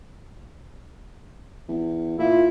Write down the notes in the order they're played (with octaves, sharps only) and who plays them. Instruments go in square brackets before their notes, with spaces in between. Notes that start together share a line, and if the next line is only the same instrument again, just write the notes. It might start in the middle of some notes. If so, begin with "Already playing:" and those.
[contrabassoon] E2
[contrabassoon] A#2 [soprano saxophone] E4 [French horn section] F4